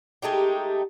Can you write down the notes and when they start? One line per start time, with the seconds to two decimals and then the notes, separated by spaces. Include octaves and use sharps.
0.22 G#3 A3 D#4 G4